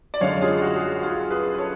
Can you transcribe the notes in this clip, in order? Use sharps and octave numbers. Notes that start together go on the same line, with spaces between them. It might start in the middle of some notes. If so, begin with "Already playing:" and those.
D5
F#2 D3 G#3 C#5 F5
F4 G#4
F#4
G#4
F#4
F4 G#4
G#4 B4
A4 C#5